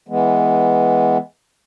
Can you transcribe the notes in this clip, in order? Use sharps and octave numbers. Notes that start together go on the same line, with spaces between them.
E3 G#3 B3